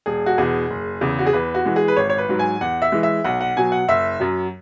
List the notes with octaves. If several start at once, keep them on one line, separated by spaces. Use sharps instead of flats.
E1 G#4
F#4
E2 B2 G#4
F#1
E2 C#3
F#4
G#4
E2 B4
F#4
E3 G#3
G#4
B4
G#1 C#5
C#5
B4
G#2 F#3
G#5
E2 F#5
E5
E3 G#3
E5
B1 F#5
F#5
B2 F#3 G#5
F#5
F#1 E5
F#2 F#3